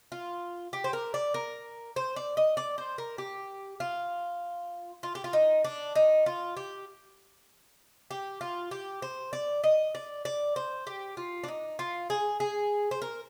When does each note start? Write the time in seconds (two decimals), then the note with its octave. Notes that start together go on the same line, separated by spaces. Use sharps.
0.12 F4
0.73 G4
0.84 C5
0.93 A#4
1.14 D5
1.34 A#4
1.96 C5
2.16 D5
2.37 D#5
2.57 D5
2.78 C5
2.98 A#4
3.18 G4
3.80 F4
5.03 F4
5.15 G4
5.24 F4
5.33 D#4
5.64 D4
5.95 D#4
6.26 F4
6.57 G4
8.11 G4
8.41 F4
8.71 G4
9.02 C5
9.33 D5
9.64 D#5
9.95 D5
10.25 D5
10.56 C5
10.87 G4
11.17 F4
11.44 D4
11.48 D#4
11.79 F4
12.10 G#4
12.40 G#4
12.91 C5
13.02 A#4